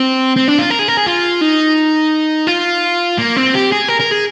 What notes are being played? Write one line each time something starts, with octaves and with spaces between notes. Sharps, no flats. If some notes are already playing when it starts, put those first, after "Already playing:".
Already playing: C4
C4
D4
F4
A#4
G#4
A#4
G#4
F4
D#4
F4
A#3
C4
G4
G#4
A#4
A#4
G#4